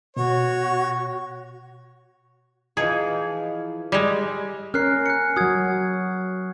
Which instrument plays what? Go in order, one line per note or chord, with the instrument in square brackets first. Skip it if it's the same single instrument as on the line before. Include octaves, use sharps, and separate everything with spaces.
[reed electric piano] B2 [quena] F#4 [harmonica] C#5
[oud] E3 F3 D#4 [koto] G#4
[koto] G3 G#3
[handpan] C#4 A#4 [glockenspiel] F6 F#6 C7
[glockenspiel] F#6 C#7
[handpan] F#3 F#4 [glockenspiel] D#6 G#6